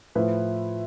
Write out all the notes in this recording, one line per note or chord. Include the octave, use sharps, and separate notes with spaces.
A2 F3 A3 E4 B4